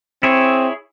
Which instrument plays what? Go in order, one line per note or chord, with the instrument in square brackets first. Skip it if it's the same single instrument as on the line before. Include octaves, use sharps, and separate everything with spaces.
[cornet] C4 [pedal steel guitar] E4 G#4 C#5